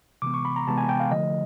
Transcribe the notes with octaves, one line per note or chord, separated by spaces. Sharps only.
C3 E3 G#3 B3 D6
C#6
B5
A#5
C3 E3 G#3 B3 A5
G#5
G5
F5
D3 F3 A3 D#5